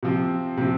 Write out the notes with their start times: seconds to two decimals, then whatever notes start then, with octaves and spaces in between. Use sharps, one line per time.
0.03 C3 F3 C4
0.58 C3 F3 C4